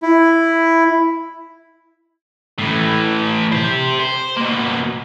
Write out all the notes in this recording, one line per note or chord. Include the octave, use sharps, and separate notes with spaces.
E4
A2 E3
G4 C5
C5
B2 A#3